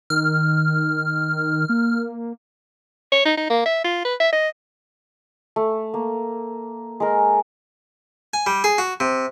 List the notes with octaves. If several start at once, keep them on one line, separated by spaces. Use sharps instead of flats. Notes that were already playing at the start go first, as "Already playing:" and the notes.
D#3 F6
A#3
C#5
D#4
D#4
A#3
E5
F4
B4
E5
D#5
A3
A#3
G#3 A#4
G#5
G3
G#4
F#4
C3